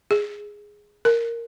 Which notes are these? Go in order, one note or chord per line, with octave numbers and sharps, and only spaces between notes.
G#4
A#4